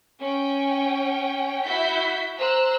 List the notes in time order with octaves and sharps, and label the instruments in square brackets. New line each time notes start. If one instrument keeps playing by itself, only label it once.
[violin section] C#4 G5
E4 F#4 G6 B6
C5 A#5 E6 F#6